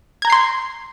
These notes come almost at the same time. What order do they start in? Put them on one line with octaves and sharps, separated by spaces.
G#6 A#5 G6 C7 C6